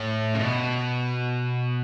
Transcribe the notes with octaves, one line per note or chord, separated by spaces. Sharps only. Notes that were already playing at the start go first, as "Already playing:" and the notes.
Already playing: A2
C#3
B2